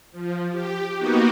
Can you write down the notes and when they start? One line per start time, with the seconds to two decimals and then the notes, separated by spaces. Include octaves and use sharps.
0.12 F3
0.50 G4
0.96 A#3 B3 D#4 F#4 G4